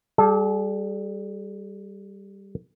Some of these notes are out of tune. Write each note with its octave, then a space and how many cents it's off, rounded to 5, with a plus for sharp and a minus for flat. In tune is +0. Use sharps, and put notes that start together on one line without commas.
G3 +0 A4 -45 A5 +0